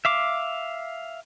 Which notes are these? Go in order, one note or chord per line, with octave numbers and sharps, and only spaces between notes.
E5 F5 D6